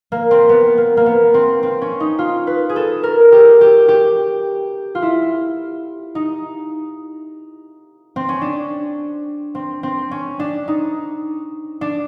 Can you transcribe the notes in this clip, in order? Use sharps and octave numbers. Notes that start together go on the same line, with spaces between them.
A#3
C4
B3
A#3
A#3
B3
C4
C4
C#4
D#4
F4
B4
G#4
A4
A#4
G4
G4
G4
F4
E4
D#4
C4
C#4
D4
C4
C4
C#4
D4
D#4
D4